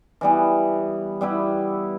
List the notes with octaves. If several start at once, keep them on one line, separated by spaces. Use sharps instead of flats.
E3 G3 B3
G3 B3 E4 G4